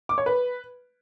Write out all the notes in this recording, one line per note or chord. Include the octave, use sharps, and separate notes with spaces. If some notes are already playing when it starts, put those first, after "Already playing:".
D6
C#5
B4